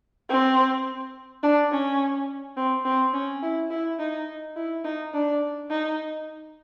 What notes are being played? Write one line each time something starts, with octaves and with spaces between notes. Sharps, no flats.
C4
D4
C#4
C4
C4
C#4
E4
E4
D#4
E4
D#4
D4
D#4